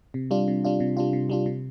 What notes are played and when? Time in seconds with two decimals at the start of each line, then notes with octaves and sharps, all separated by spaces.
0.14 C3
0.31 G3 D4 F4
0.48 C3
0.65 G3 D4 F4
0.80 C3
0.97 G3 D4 F4
1.13 C3
1.29 G3 D4 F4
1.46 C3